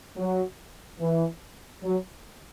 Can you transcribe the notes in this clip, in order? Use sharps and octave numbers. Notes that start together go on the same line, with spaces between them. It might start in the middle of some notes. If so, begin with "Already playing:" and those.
F#3
E3
F#3